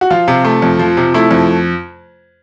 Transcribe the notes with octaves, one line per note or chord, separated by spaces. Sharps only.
F#4
F3 F4
C3
A3
F2
F3
C3
A3 E4
F2